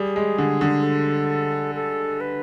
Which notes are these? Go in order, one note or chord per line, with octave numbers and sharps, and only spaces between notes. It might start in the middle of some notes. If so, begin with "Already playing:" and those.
Already playing: G3 G#4
G#3
D3
D3
A4
A4
B4